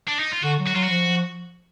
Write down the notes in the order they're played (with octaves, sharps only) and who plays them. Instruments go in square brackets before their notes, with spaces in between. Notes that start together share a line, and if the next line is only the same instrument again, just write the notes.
[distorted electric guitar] D4
D#4
F4
[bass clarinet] D3 [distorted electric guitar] F#4
[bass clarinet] F#3
[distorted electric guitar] F#4
[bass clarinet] F#3 [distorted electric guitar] F4
[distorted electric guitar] F#4
[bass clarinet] F3